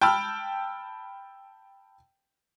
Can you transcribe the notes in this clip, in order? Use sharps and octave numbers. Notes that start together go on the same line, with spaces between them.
G5 A5 B5 E6 F6